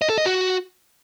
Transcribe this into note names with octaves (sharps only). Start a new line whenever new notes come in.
D#5
A4
D#5
F#4